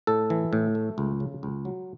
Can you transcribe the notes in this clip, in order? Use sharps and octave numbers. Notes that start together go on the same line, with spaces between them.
A2 A4
E3
A2
A3
C#2
C#3
C#2
F#3